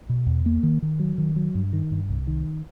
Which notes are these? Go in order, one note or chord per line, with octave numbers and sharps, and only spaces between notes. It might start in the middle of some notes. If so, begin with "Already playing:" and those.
B2
E2
A#3
D#3
D#3
F#3
D#3
F#3
G2
D#3
G2
C2
D#3